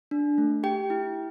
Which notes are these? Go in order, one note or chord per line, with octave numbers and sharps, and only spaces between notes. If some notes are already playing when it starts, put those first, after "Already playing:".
D4
A3
G4 G5
E4